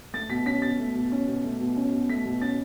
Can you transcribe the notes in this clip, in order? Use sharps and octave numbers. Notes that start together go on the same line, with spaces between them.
A3 A6
B2 B6
C#4 B6
B2 A6
A3
B2
C#4
B2
A3
B2
C#4
B2
A3 B6
B2
C#4 A6